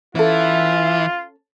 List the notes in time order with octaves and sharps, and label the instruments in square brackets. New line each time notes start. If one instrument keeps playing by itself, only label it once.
[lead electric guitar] E3 [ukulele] C#4 A4 [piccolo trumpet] F4 [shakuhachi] E5